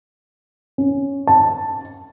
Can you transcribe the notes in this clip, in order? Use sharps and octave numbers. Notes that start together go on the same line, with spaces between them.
C#4
A5